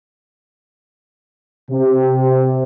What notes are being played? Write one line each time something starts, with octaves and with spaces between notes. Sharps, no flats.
C3